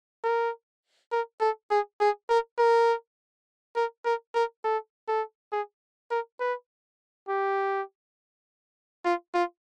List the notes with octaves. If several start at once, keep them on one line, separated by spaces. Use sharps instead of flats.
A#4
A#4
A4
G#4
G#4
A#4
A#4
A#4
A#4
A#4
A4
A4
G#4
A#4
B4
G4
F4
F4